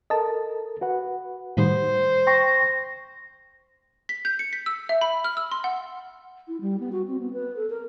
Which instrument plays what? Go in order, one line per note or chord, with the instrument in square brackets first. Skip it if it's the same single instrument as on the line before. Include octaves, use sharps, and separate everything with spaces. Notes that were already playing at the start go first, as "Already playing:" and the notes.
[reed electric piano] A4 A#4 [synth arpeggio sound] D#5 A5
[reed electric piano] F#4 B4 F#5
[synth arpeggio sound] A2 D#3 G3 [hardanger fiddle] C5
[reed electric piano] G5 C6 C#6 [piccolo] A#6
[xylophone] B6
G6
C#7
B6
E6
E5
B5
F6
E6
C6
F#5
[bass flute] E4
G3
B3
F#4
C4
B3
B4
A4
A#4